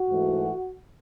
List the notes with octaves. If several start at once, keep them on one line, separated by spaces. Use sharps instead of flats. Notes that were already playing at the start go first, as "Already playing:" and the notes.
Already playing: F#4
G#2 E3 A3